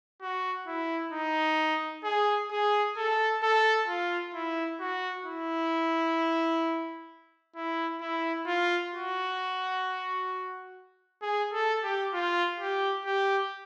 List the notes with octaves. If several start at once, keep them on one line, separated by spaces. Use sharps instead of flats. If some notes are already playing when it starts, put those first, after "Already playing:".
F#4
E4
D#4
G#4
G#4
A4
A4
F4
E4
F#4
E4
E4
E4
F4
F#4
G#4
A4
G4
F4
G4
G4